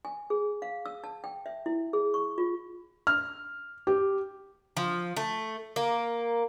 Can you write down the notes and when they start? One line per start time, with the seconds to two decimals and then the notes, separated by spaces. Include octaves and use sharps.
0.05 G#5
0.30 G#4
0.62 F5
0.86 E6
1.04 A5
1.24 G5
1.46 E5
1.66 E4
1.93 G#4
2.14 C#6
2.38 F4
3.07 F6
3.87 G4
4.77 F3
5.17 A3
5.76 A#3